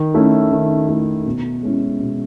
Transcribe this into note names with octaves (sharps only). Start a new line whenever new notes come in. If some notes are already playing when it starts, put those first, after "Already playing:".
Already playing: D#3
A3 C#4 E4
D#3
A3 C#4 E4
B2
G#3 C#4 E4
B2